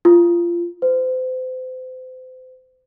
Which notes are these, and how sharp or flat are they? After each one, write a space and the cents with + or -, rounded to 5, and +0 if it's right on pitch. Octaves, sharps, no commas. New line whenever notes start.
F4 -20
C5 -35